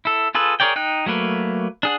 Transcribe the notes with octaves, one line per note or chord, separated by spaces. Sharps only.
E4 A4
F4 G#4 A4 B4
G#4 A#4 C#5 D5 G5
D#4 G5 F#6
F#3 A3 A#3 B4
D4 G#4 F#5